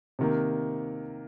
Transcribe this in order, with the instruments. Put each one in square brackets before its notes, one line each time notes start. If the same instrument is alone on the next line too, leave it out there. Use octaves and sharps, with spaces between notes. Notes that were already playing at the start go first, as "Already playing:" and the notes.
[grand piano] C3 D#3 A#3